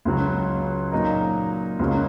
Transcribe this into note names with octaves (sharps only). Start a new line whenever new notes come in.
C#2 C#3 F#3
A#2 F#3 D#4 A#4
C#2 C#3 F#3 A#3